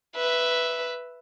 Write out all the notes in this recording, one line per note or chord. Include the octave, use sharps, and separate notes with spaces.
B4 E5